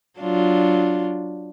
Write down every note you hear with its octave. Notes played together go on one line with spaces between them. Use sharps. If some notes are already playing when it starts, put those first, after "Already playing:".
F#3 D4 F4